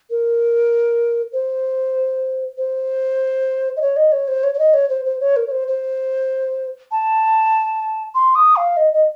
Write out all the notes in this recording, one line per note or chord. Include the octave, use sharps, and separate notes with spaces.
A#4
C5
C5
D#5
C#5
D#5
C#5
C5
C#5
C#5
D#5
C#5
C5
C5
C#5
A#4
C#5
C5
C5
A5
C6
D#6
F5
D#5
D#5